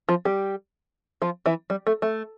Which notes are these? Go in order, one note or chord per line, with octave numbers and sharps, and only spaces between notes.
F3 F4
G3 G4
F3 F4
E3 E4
G3
A3
A3